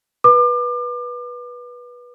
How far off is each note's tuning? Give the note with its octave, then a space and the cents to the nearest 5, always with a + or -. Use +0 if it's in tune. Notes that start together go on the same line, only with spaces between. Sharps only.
B4 -20 D6 +35